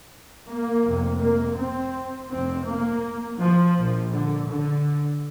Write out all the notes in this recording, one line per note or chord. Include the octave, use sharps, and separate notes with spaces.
A#3
F1 F2 C3
A#3
C4
F1 F2 C3 C4
A#3
F3
A#1 A#2
D3
D3